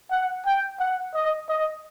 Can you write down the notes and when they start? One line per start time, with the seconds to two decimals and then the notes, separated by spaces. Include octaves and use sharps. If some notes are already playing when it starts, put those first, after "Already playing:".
0.11 F#5
0.46 G5
0.80 F#5
1.14 D#5
1.49 D#5